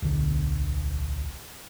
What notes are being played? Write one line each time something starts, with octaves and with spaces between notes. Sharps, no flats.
D1 B1 D3